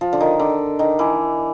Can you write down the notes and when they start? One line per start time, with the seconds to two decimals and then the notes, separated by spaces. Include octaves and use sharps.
0.01 F3
0.13 D3
0.21 D#3
0.39 D3
0.79 D#3
0.99 E3